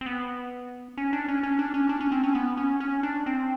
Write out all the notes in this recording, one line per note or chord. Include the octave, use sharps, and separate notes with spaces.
C4
B3
C#4
D4
C#4
C#4
D4
C#4
D4
C#4
C4
C#4
B3
C#4
C#4
D4
C4